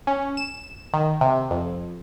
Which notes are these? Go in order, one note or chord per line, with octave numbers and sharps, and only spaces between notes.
C#4
E7
D#3
C3
F2